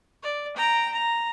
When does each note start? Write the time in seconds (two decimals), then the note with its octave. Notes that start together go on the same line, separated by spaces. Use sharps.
0.23 D5
0.56 G5 A#5
0.92 A#5